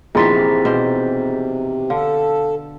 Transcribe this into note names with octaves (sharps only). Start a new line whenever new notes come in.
A#1 C3 D#3 E3 G#4 C6 A6 B6
B2 G4 C5
D3 A4 F5